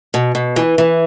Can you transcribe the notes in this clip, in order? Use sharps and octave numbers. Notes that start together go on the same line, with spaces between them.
B2
B2
E3
E3